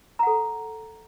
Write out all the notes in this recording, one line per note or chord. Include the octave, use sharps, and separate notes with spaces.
A4 F#5 A#5